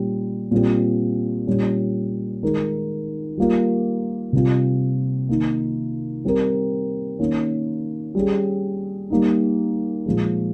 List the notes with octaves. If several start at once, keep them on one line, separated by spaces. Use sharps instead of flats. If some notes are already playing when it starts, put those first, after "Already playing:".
Already playing: A#2 G3 C#4
A#2 G3 C4 G4
A#2 G3 C#4
D#3 G#3 D#4 A#4
G3 A#3 F4 A#4
C3 G3 C4 F4
D#3 A#3 D#4
G3 C4 G4 A#4
D#3 A#3 C#4
G3 C#4 G#4
G3 A#3 D#4
A#2 F3 G#3